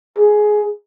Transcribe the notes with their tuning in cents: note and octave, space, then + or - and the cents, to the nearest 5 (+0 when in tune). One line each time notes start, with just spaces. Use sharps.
G#4 +15